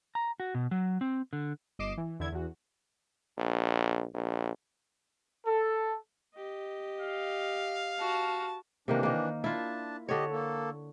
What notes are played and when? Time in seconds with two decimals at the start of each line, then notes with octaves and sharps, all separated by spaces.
0.15 A#5
0.40 F#4
0.55 B2
0.71 F#3
1.01 C4
1.33 D3
1.79 G1 D#5 D6 C7 E7
1.97 E3
2.20 E2 D3 E4 G#6
2.32 E2 F#4
3.38 A#1
4.14 A#1
5.47 A4
6.35 G4 D#5
7.00 F5
8.00 F#4 A5
8.88 C3 D#3 E3 A#3 D4
9.03 D#3 A#3
9.44 D4 E4 F4 A5
10.09 D3 G4 C#5 D#5
10.31 A#3 A4